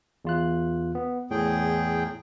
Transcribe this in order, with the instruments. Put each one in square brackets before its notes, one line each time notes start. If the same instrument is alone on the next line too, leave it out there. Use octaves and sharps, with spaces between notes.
[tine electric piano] E2 F4 F#6
B3
[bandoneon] E2 G#4 G5 [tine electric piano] A2